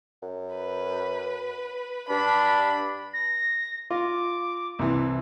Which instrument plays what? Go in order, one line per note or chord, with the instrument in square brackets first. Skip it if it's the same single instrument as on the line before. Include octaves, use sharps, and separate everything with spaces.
[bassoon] F#2
[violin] B4
[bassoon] G2 [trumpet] D4 [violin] B5
[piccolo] A#6
[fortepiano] F4 [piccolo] D6
[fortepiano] C2 C3 E3